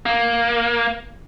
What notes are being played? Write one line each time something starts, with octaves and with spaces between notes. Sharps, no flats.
A#3